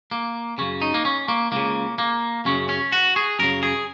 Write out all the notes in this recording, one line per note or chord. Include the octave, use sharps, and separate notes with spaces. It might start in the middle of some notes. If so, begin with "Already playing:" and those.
A#3
F#2 C#3 C#4
D#4
A#3
C#4
A#3
C#2 C#3 A#3
A#3
F#2 C#3 C#4
C#4
F#4
G#4
F#2 C#3 A#4
G#4